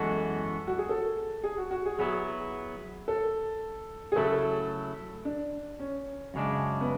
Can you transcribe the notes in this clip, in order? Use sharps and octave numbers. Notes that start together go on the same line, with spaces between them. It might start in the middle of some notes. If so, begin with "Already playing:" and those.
Already playing: F#2 E3 G#3 B3 F#4 A4
F#4
G#4
A4
G#4
F#4
F#4
G#4
F#3 B3 E4 G#4
A4
G#4
C#3 F#3 A3 E4 A4
D4
C#4
F#2 C#3 G#3 D4
B3